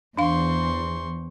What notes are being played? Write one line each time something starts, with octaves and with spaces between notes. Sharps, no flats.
E2 D4 C5 F5 C6 C#6